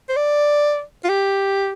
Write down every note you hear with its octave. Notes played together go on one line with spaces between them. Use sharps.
C5
D5
F4
G4